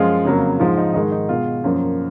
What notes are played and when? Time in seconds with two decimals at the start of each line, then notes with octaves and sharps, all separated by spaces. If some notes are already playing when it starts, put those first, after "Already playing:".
Already playing: F#2 F3 G#3 F4
0.25 F2 C#3 F#3 A#3
0.59 G#2 F3 G#3 F4
0.77 D#4
0.94 G#2 D#3 G#3 D#4
1.12 D#4
1.29 B2 G#3 F4
1.64 F#2 F3 A#3